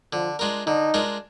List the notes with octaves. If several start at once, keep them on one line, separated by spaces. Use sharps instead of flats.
D3 F3
G#3 D4 F4 A#4
D3 D#4
G#3 D4 F4 A#4